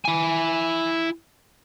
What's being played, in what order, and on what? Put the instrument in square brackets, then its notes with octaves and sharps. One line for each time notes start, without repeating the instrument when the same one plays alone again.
[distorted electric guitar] E4 G#5